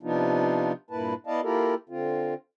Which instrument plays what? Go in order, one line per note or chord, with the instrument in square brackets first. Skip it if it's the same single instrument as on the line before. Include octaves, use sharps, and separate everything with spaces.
[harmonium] C3 F3 B3 D4 D#4 F4
G2 A#2 A#3 E4 B4 A5
B3 E4 D5 D#5 F5 A5
A#3 E4 F4 G4 A4 A#4
D3 C4 F4